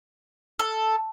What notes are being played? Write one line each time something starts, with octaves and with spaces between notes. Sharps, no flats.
A4